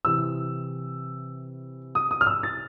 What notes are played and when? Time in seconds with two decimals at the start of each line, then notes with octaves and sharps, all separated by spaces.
0.05 C3 E3 E6
1.95 D#6
2.11 D#6
2.21 F6
2.27 E6
2.43 A6